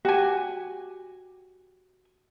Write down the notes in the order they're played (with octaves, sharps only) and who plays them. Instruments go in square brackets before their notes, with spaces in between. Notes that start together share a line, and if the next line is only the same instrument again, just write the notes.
[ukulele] F#4 G#5 [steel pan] G4